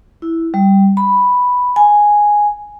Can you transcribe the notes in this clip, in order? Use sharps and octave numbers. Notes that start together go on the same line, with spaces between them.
E4
G3
B5
G#5